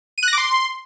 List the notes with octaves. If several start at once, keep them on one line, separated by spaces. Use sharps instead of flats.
D#7
F#6
A#6
D6
C6